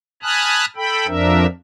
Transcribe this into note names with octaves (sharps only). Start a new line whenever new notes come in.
G#5 A5 B5 D#6 F6 F#6
A4 G5 B5
F2 F3 D4 A#4 E5